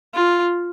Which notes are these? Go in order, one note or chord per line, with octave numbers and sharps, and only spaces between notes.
F4